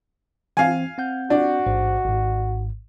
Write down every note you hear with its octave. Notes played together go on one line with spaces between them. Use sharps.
E3 C4 F5 G#5
C4 F#5 G6
D4 F#4
A1 G#2 C5
G#1 G#2